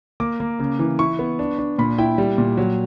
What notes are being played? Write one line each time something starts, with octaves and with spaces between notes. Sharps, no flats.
A#3 D6
A#3
C#3
E3
E4 C#6
B3
D4
D4
A#2 B5
E4 G5
G3
A#2
F#3